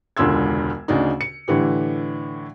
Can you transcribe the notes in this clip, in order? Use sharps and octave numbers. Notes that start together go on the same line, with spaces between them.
E1 C#2 D3 C6 E6 G#6
D2 C#3 D4 D#4
C#7
A2 D3 E3 G4